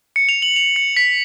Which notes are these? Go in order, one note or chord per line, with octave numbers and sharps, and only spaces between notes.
C#7
F7
F#7
F7
C#7
B6